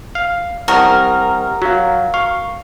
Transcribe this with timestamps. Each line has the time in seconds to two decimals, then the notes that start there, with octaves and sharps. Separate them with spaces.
0.15 F5
0.68 C2 A#4 F#5 C#6 D#6
1.62 F#3 F#4 F5
2.14 F5 C#6